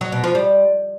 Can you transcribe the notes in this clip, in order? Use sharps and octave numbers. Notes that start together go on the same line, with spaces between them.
F#3
B2
F3
G3